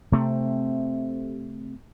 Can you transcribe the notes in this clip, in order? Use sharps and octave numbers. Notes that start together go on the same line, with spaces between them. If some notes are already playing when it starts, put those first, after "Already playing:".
C3 A3 C4